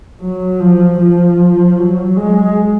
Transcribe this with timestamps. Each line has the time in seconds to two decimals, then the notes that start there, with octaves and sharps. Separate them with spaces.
0.21 F#3
0.60 F3
1.00 F3
1.78 F#3
2.17 G#3